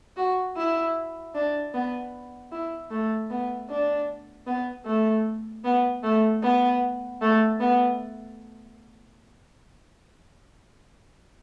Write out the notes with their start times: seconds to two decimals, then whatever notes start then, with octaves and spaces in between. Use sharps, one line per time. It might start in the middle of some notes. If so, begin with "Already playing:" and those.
0.17 F#4
0.57 E4
1.35 D4
1.74 B3
2.52 E4
2.91 A3
3.30 B3
3.70 D4
4.47 B3
4.86 A3
5.64 B3
6.03 A3
6.43 B3
7.22 A3
7.60 B3